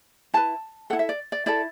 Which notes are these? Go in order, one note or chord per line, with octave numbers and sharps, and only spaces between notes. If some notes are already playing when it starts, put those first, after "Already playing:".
E4 B4 A5
E4 A4 F#5
E5
D5
D5
E4 A4 D5